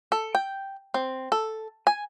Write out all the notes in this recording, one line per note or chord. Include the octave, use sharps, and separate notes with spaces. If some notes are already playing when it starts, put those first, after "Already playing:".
A4
G5
C4
A4
G#5